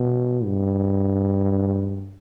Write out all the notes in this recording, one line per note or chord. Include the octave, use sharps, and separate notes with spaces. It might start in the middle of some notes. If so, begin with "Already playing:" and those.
Already playing: B2
G2